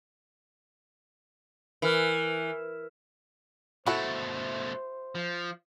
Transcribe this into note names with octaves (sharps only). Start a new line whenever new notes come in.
E3 A#4 F6
B2 A3 E4 F#4 A4 C5
F3